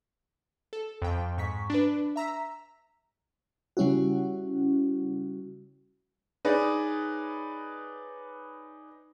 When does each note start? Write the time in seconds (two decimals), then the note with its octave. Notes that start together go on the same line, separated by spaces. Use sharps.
0.73 A4
1.02 F2 G5
1.37 G#2 C#6 B6
1.70 D4 B4
2.16 E5 A#5 E6 B6
3.77 C#3 G3 C#4 E4 F#4
6.45 D#4 G#4 B4 C#5 D5